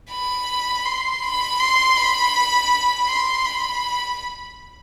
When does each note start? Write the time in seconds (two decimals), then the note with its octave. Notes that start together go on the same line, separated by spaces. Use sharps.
0.11 B5
0.86 C6
1.22 B5
1.60 C6
1.97 B5
3.08 C6
3.45 B5